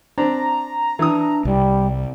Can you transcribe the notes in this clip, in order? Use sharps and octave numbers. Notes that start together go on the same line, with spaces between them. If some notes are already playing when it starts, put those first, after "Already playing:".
C4 D4 A#5
E3 D4 D#6
C2 G3